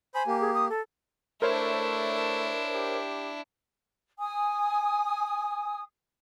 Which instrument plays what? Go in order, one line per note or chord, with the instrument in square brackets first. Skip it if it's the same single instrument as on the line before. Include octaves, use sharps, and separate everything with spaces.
[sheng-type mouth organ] C5 B5 [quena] G#5
[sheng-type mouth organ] A#3 G4
[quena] G#4
D#6
A4
[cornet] A3 [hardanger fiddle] D4 E4 [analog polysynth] A#4 C5 C#5
[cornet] G4
[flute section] G#5 D#6